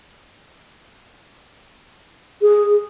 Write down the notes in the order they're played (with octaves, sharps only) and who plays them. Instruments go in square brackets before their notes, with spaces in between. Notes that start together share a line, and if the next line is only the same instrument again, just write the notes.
[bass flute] G#4